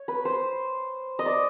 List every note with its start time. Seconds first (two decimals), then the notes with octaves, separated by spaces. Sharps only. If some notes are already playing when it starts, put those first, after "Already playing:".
Already playing: C#5
0.08 B4
0.25 C5
1.19 D#5
1.26 D5